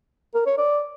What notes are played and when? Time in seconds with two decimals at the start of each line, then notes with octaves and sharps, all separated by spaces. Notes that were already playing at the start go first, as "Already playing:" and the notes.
0.35 A#4
0.46 C#5
0.58 D5